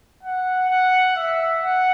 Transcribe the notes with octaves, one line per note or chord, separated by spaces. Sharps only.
F#5
F#5
E5
F#5